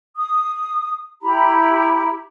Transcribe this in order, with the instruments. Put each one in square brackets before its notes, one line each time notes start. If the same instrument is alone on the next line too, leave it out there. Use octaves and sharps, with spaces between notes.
[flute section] D#6
E4 G4 A#5 B5